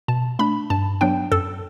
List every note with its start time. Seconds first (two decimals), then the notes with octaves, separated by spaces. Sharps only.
0.08 B2 A5
0.39 A3 D4 B5
0.70 G2 A5
1.01 F#3 B3 D4 G5
1.32 F#2 A4